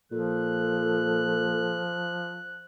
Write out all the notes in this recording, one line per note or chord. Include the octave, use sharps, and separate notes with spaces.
A#2 F3 A4 F#6